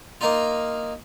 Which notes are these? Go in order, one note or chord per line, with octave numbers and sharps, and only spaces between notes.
A#3 D#4 F4